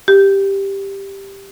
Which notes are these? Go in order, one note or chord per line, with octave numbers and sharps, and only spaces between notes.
G4